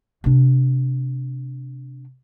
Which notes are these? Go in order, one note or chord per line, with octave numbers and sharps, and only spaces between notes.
C3 D4